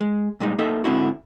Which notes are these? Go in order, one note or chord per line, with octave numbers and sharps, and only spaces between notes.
G#3
A#2 G3 G#3 D#4
A#3 D#4 A4 D#5 E5
G#2 D3 C4 E4 F#4